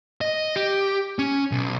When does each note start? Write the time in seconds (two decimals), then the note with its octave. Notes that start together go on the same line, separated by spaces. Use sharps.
0.21 D#5
0.56 G4
1.19 C#4
1.52 B1